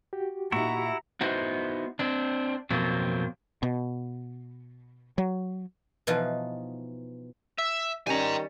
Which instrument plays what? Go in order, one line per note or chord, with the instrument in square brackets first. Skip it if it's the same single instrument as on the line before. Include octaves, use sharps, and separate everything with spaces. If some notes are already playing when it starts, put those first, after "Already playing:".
[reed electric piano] F#4 G4
[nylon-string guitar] A#2 D#4 [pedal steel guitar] E4 F#5 C#6 [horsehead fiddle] E5 A#5
[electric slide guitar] B3 D#4 E4 F#4 C5
C4 D4
F2 B2 F#3 A#3 C4
[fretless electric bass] B2
F#3
[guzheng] B2 E3 F3 D#4 F4
[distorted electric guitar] E5
[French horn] D#3 [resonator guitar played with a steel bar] G3 C#4 [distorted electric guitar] G#5 A#5